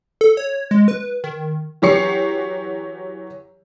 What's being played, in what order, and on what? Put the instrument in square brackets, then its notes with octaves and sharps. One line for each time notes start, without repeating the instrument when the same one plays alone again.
[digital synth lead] A4
C#5
G#3
B4
D#3
[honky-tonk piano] E3 F#3 G4 C#5 C7 C#7